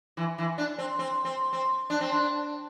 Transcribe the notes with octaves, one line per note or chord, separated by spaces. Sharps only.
E3
E3
D4
C4
C4
C4
C4
D4
C4
D4